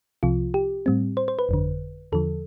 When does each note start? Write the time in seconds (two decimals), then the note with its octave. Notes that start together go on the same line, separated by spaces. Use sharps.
0.23 C2 C3 F3 F4
0.54 G4
0.86 A2 G3 C4
1.17 C5
1.28 C5
1.39 B4
1.49 G1 F2 D3
2.12 E2 D3 F3 A4